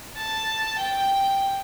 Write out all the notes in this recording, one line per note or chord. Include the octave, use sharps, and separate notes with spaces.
A5
G5